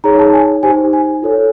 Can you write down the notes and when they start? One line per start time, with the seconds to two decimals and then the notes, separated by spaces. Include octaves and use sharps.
0.04 D#4 G#4 C#5 A#5
0.19 A5
0.33 G#5
0.63 D#4 G4 C5 G#5
0.93 G#5
1.22 F4 A4 C#5